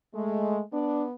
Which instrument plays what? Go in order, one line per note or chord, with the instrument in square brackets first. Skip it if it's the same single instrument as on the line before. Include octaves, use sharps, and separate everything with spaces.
[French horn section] G#3 [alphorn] A3
[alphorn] B3 [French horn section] D4